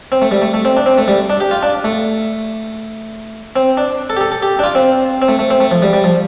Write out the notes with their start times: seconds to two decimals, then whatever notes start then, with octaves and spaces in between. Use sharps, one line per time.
0.12 C4
0.22 A3
0.31 G3
0.42 A3
0.54 A3
0.65 C4
0.77 D4
0.86 C4
0.98 A3
1.08 G3
1.30 D4
1.40 G4
1.51 F4
1.63 D4
1.84 A3
3.56 C4
3.77 D4
4.10 A4
4.17 G4
4.21 A4
4.32 A4
4.43 G4
4.59 D4
4.64 F4
4.75 C4
5.22 C4
5.28 A3
5.39 A3
5.50 C4
5.60 A3
5.71 F3
5.82 G3
5.93 G3
6.04 F3